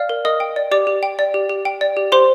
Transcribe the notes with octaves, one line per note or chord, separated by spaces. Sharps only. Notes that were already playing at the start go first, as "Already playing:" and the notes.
Already playing: D5 F5 F6
A#4
A#4 D#5 D#6
G5
D5
G4 D5 D6
G4
G5
D5
G4
G4
G5
D5
G4
G4 C5 C6